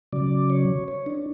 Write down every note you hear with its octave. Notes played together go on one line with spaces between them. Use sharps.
C#3 F#3 D5
C#5
C#5
D4